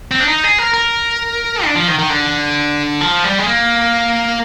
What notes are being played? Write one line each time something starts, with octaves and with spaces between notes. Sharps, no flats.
C4
D4
D#4
G#4
A#4
A#4
D4
F3
D#3
D#3
D3
F3
G3
G#3
A#3